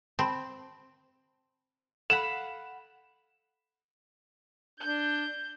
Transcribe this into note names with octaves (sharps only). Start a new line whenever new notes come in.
C4 A5 B5
A4 F5 F#5 B5 E7
D4 G6